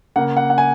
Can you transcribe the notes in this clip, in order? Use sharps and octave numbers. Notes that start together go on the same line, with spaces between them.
C#3 A#3 F#5
F#5
F#5
G#5